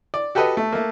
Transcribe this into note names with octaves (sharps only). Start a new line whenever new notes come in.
D5
F#4 G4 A4 B4 D#5
A3
A3 A#3